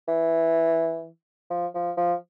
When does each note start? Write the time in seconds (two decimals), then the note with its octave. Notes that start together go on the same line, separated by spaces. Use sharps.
0.08 E3
1.50 F3
1.75 F3
1.97 F3